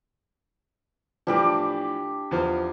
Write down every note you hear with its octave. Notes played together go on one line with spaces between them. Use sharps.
A2 E3 F3 D4 G4 D6
E2 F3 C5